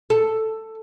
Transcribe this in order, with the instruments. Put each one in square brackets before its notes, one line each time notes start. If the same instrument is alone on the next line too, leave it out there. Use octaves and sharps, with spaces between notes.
[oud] A4